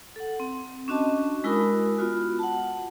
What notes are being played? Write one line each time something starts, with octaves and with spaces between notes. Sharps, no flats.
A4 F#5
C4
C#4 D4 F#4 D#5 A5
G#3 E4 F#4 A#4 B5 D#6
B3 F4 F#4
F#5 A5